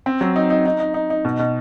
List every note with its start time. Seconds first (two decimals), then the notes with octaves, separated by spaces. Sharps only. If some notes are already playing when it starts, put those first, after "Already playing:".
0.06 C4
0.21 F#3
0.36 D#4
0.50 D#4
0.66 D#4
0.80 D#4
0.94 D#4
1.10 D#4
1.25 B2
1.39 B2